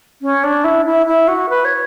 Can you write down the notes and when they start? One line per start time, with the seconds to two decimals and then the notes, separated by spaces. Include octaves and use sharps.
0.21 C#4
0.43 D4
0.64 E4
0.85 E4
1.06 E4
1.27 F#4
1.49 B4
1.64 C#5